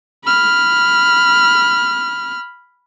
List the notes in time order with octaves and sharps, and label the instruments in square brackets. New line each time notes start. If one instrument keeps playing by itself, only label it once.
[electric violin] B5 F6